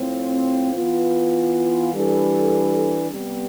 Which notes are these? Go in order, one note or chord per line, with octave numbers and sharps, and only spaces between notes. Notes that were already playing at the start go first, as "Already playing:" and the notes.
Already playing: A2 F3 C4
E3 B3 F4
E3 G3 D4 A4
C3 G3 B3